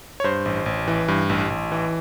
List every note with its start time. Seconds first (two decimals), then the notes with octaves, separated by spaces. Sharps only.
0.20 C#5
0.24 G2 C5
0.45 A1
0.66 A1
0.88 E3
1.08 G2
1.29 A1
1.50 A1
1.72 E3